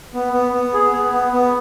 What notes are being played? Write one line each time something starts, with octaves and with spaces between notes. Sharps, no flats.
B3
B3
B3
G#4
B3
B3
B3